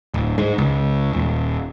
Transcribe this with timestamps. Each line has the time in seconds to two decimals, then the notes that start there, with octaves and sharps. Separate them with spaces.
0.14 D1
0.38 G#2
0.58 C#2
1.13 D#1